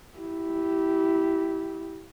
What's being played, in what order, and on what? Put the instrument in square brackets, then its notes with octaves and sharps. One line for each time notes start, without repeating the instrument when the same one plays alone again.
[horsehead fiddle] E4 G4